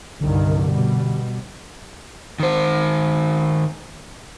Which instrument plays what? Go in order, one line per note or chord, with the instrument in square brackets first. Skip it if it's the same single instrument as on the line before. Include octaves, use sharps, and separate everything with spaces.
[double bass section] C2 G2 D#3 [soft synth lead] D3
[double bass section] B2 G3
[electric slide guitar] D#3 C5